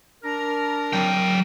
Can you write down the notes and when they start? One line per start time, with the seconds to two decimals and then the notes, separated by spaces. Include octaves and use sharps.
0.23 D4 A#4
0.93 F#3 G5